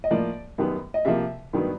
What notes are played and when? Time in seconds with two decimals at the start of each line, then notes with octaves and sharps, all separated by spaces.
0.04 D#5
0.11 A2 F3 A#3 D5
0.58 F#2 D#3 G3 B3
0.94 D#5
1.05 C3 F3 A#3 E5
1.53 G2 D#3 F#3 B3